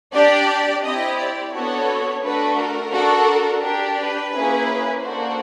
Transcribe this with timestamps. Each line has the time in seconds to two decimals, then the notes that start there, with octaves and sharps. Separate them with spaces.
0.14 D4 G4 D5
0.84 C4 E4 G4 D#5
1.18 D5
1.53 B3 D4 F#4 A4 C#5
2.23 A3 D4 F#4 A4 B4
2.58 A#4
2.93 D4 F#4 A4
3.63 D4 G4
3.98 B4
4.33 A#3 C#4 E4 G#4
5.03 A#3 D4 F#4 A4 C5